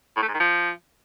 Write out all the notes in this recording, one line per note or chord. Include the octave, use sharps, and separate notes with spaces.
A2
A3
G#2
D#3
F3